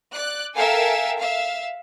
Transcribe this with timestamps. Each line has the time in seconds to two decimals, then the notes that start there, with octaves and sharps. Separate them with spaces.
0.13 D5 F#6
0.55 A4 A#4 E5 F5 G5 G#5
1.18 E5 F5